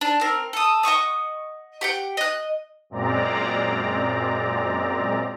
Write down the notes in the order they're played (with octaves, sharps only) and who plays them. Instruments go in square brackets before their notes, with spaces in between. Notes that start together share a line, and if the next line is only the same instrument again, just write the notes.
[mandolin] D4
C4 A#4
A4 D#6
D#5 F#5 C#6 D#6
G4 F#5 G5
D#5 F#6
[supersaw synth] F#2 A#2 G#3 C4 D5 A#5